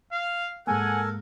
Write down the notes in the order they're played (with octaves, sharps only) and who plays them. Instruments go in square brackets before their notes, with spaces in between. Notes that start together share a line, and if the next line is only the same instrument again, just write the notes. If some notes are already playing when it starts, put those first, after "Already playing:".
[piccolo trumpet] F5
[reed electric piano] G#2 G#3 A#3 [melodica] A4 A#4 [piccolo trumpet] F#5 [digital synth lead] G#5